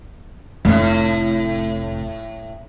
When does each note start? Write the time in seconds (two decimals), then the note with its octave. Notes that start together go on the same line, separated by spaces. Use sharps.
0.65 F1 F2 A2